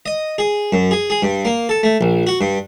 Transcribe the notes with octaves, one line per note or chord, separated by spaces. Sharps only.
D#5
G#4
F#2
G#4
G#4
G2
A#3
A4
A3
A#1
F#4
G2